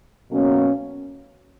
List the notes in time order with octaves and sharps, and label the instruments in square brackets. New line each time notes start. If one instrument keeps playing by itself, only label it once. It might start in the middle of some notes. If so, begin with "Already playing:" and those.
[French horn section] B2 F#3 A#3 C#4